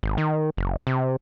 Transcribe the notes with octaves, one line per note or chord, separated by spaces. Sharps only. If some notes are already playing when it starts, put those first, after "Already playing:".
G#1
D#3
F#1
C3